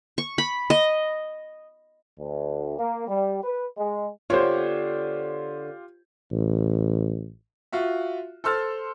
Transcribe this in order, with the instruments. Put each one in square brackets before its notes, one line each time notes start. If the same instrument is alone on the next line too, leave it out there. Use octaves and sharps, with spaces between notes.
[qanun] C#6
B5
D#5
[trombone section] D2
A#3
G3
B4
G#3
[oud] D3 B3 [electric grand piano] F4 G4 [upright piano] C5 C#5
[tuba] A1
[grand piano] F4 F#4 E5
A4 C5 C6 E6 F6 A6